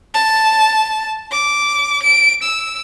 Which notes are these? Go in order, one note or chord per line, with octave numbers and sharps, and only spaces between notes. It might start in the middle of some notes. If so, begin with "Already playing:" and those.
A5
D6
D7
E6